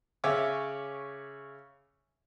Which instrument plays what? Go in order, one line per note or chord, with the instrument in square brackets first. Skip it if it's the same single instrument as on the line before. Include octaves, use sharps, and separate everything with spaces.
[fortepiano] C#3 C#5 E5 G#5 D6 E6